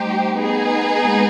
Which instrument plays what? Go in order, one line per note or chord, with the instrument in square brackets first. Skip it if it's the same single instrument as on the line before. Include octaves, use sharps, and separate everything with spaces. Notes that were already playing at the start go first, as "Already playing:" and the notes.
Already playing: [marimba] G3 A3 [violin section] D#4 G4 C5
[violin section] B3 D#4 G#4
[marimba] G#3 A#3